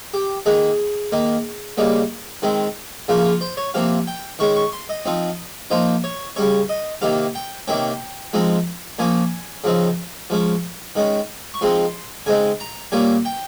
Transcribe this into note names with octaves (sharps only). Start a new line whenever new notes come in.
G4
D#3 A#3 D#4 G#4
D#3 A#3 D#4
C#3 G3 A#3 D#4
D#3 G#3 C4 D#4
C#3 F3 A#3 C#4 F4
F4
C5
C#5
C3 F3 A#3 F5
G5
D#3 G#3 C#4 C#6
C#6
C6
D#5
F3 C4 D#4
F3 A#3 D#4 C5
C#5
C#3 G3 C#4 C#5
D#5
C3 D#3 A#3 D#4 F5
G5
C3 D#3 A#3 C#4 G5
F3 G#3 C4 D#4
A#2 F3 A#3 C#4 G#5
C#3 F3 C4 D#4
F3 G#3 C#4
D#3 G#3 C#4
C#6
F3 G#3 C4 D#4 C6
C#3 G#3 C4 D#4 G#5
A#5
A#2 G3 A#3 C#4 G#5
G5